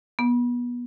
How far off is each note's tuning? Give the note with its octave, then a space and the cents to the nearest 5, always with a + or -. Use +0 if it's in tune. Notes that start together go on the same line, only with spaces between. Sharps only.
B3 -25